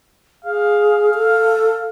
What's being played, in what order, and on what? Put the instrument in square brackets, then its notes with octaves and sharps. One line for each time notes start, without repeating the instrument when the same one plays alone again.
[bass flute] G#4 [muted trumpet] F5
[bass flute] A4